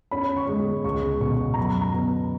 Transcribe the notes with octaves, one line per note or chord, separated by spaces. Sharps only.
C#4 B5
C#6
G#3
C#2 C#6
B2 C#6
A#5
F#2 B5
A#5
B3